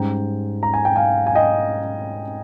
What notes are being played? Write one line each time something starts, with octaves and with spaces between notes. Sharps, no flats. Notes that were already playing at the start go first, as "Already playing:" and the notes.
Already playing: G#2 G3 C#4 G5 A#5
A#5
G#5
G5
F5 G#5
G#5
D#5 G5